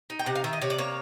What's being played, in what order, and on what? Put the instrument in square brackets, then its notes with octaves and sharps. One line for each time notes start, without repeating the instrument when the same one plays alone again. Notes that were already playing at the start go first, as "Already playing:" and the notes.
[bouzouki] D#4
G5
C3 F#5
F5
D#3 E5
D#5
C3 C#5
D5
A#3 C#5